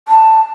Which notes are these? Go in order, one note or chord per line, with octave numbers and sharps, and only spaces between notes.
A5